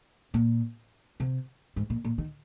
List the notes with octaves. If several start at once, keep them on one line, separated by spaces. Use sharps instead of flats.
A#2
C3
G#2
A#2
A#2
D#3